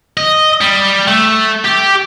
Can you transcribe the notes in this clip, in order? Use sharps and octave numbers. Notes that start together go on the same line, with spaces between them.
D#5
G3
A3
G4